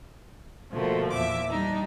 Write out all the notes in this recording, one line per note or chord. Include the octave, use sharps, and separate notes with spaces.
B2 D3 F3 A3 A#3
E2 A#2 E5 D6
G3 D4 D#4